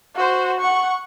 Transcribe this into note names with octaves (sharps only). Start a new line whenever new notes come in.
F#4 C5
F#5 C#6